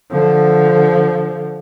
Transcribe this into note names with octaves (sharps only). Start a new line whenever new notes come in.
D3 F3